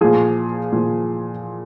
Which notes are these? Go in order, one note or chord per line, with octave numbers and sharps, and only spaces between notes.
A#2 F3 G#4
A#2 F3